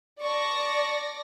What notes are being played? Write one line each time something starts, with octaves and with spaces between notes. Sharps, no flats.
D5 A5 C#6 A#6